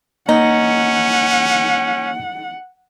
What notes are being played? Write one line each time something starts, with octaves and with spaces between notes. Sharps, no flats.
A#3 C#4 D#4 F#5